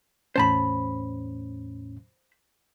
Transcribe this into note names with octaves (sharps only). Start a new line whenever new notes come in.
E2 A2 C#4 C5 A5 B5